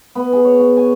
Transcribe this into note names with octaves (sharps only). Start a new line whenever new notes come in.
B3
G#4
C#5
F#4
G#5